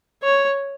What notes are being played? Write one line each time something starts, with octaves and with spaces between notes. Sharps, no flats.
C#5